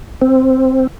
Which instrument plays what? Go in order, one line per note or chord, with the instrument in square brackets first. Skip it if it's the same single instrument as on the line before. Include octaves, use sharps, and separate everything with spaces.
[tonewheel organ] C4